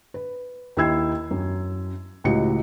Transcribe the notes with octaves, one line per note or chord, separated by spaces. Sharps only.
B4
D#2 D#4 E4 E6 G#6 C7
F#2
C#2 A2 F#4 G4 D#5 C#7